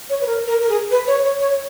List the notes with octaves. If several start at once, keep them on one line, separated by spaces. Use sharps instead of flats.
C#5
B4
A#4
A#4
A#4
G#4
B4
C#5
C#5
C#5